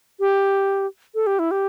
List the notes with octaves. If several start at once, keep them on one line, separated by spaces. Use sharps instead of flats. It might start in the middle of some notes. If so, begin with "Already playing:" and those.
G4
A4
G4
E4
G4